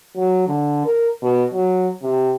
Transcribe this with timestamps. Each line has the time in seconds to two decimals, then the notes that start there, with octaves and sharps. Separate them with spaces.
0.17 F#3
0.47 D3
0.85 A#4
1.22 B2
1.53 F#3
2.03 C3